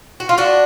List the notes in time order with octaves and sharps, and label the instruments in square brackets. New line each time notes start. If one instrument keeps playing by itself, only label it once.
[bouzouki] F#4
F4
D4 F#4